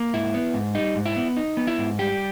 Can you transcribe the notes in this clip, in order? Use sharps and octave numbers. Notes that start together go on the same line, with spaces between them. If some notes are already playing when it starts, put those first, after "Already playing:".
Already playing: A#3
G#2 E4
B3
G#2
G3 D#4
G#2
E4
B3
D#4
B3
E4
G#2
G3 G4